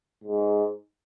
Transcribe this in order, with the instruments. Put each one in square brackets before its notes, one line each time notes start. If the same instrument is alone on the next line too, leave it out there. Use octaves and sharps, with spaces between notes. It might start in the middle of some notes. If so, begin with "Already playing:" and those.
[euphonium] G#2